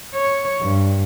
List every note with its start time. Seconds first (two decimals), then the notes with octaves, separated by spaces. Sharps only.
0.14 C#5
0.62 G2